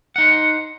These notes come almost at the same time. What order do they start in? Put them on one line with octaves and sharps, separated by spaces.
F#5 D#4 C5